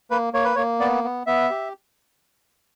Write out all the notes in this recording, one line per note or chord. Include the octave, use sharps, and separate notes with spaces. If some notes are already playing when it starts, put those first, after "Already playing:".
A#3 B4
A#3 C#5
B4
A#3 C#5
B3 D5
B3
B3 E5
G4